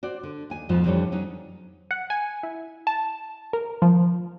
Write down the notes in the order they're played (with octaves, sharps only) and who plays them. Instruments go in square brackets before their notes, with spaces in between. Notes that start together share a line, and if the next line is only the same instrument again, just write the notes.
[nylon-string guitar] F#4 C5 D5
D3
D#2 G#5
F2 G#2 B2 F3
F2 D3 E3 G3 A4 C#5
F#3 C#4 D#4
[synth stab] F#5
G#5
E4
A5
A#4
F3